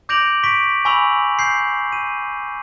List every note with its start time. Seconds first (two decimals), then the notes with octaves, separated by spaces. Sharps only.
0.09 D6 G6 A#6 D7 F7 F#7
0.44 C#6 B6 D7
0.85 G#5 B5 C#6 E6 F7 F#7
1.39 G6 C7
1.92 D#7